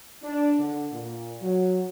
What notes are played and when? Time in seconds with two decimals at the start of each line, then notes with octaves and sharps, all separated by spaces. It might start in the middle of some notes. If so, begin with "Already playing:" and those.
0.23 D4
0.59 D3
0.91 A#2
1.41 F#3